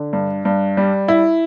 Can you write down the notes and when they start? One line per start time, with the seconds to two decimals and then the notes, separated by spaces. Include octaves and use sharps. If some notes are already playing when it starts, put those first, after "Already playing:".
Already playing: D3
0.13 G2
0.45 G2
0.77 G3
1.08 E4